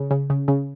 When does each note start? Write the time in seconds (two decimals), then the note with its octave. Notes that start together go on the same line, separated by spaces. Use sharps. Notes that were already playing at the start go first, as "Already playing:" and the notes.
Already playing: C#3
0.11 C#3
0.30 C#3
0.48 C#3